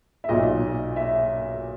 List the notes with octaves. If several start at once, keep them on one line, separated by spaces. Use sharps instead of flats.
E5
B1 A#2 D#5
E5